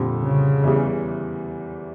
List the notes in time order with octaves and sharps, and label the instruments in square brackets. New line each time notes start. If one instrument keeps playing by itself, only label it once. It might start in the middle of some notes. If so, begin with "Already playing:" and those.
Already playing: [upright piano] F2 D3 G3 [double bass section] A#2
[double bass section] C#3
[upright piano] E2 E3 G3